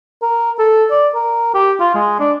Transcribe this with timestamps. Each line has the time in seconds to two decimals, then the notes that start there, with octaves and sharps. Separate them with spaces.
0.22 A#4
0.59 A4
0.91 D5
1.15 A#4
1.54 G4
1.80 F4
1.95 G#3
2.20 D4